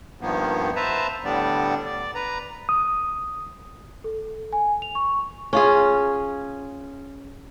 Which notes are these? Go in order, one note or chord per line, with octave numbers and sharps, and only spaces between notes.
G2 D#3 F3 A#3 B3
B4 C5 E5 A5 A#5
A2 D3 G3 B3 D4 D5
D5
B4 A#5
D#6
A4
G#5
F7
C#6
C#4 F4 G#4